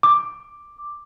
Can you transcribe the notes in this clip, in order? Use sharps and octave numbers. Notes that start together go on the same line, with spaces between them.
D6